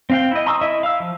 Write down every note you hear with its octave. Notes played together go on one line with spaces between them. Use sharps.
C4 F5 G5
E4 D#5
A#5 C6 C#6 D#6 E6
E4 D#5 E5
F5 E6
F3